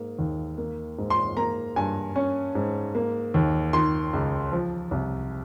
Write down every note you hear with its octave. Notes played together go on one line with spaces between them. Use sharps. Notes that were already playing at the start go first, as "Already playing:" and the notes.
Already playing: G#2 A#3
D#2
A#3
G#2
C6
A#3 A#5
G2 G#5
C#4
G#2
A#3
D#2
D#3 C6
C#2
F3
C2